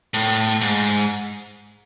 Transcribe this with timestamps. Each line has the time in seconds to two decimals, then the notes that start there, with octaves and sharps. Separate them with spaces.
0.14 A2
0.61 G#2